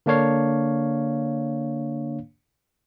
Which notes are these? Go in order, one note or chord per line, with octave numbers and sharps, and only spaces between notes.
D3 A#3 D4 C#5 F5